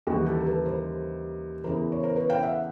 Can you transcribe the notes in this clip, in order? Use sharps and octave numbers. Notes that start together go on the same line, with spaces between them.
D#2 C#3 E3 G3 F#4 G#4
G4 A4
A#4
A4 B4
A#4 C5
E2 C#3 E3 A#4 C5
C#5
A#4 C5
B4 C#5
F5 G5
E5 F#5